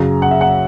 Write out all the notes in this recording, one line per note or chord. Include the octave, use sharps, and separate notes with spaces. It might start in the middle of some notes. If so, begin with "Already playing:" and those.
Already playing: F#2 C#3 F#3 A#5
F#5
E5
F#5